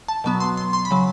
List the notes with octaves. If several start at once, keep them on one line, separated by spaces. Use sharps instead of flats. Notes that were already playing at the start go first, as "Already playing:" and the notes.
A5
B2 F#3 B3
C6
C6
C6
B5
C#3 F#3